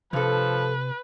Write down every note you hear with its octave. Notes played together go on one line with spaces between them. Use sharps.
G2 C3 F3 A4 B4